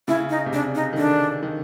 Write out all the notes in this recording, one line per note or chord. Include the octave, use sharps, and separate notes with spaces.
C#3 E4
D#4
C3
C#3 D4
D#4
D#3
D3 D4
D#3